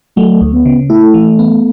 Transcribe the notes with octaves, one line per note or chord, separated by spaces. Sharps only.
F#3 A3
D2
B3
C#3
A3 E4
E3
B3